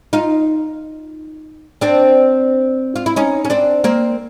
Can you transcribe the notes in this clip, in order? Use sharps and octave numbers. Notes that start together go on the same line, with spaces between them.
D#4 F4
C4 D4
F4
E4
C#4 D#4
C#4
C4 D4
A#3 C4